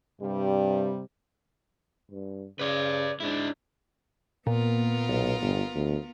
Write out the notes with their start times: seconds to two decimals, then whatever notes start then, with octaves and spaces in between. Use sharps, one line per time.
0.21 G2 C3 G3
2.12 G2
2.59 C#3 B4 D5
3.20 G#2 D4 E4
4.47 A#2 A#3 B3 F4 A#4
5.09 B1
5.41 G1
5.75 D2